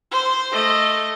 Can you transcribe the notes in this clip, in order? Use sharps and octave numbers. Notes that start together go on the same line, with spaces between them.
C5
A3 D#5